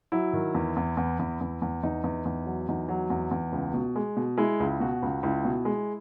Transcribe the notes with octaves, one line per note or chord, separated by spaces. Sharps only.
F#3 E4
D#3
E2
E2
E2
E2
E2
E2
E2 D#4
E2
E2
F#3
E2 D#4
F#3
E2
E2
C#2
B2
G#3
B2
G#3 E4
C#2
B2 F#4
C#2
C#2 E4
B2
G#3